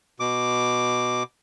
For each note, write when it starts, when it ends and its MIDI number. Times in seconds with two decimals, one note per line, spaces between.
0.20 1.23 47
0.20 1.23 86